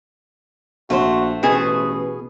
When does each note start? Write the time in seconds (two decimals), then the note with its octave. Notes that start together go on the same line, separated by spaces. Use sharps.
0.90 A#1 A3 F#4 C5
1.43 A1 B2 G#4 B4